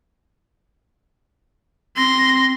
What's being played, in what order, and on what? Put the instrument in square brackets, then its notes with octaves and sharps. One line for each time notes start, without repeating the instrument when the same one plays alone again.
[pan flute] C4 [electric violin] C6 A#6